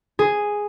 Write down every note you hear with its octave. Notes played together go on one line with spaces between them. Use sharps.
G#4